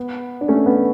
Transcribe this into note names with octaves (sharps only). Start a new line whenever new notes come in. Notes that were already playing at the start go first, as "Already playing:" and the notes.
Already playing: B3
D4
A3 C#4
B3